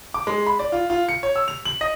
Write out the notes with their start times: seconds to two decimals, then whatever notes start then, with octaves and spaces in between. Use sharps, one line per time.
0.14 D6
0.27 G#3
0.46 B5
0.59 D5
0.72 F4
0.90 F4
1.09 C#7
1.23 C#5
1.36 E6
1.48 F7
1.66 F#7
1.81 D#5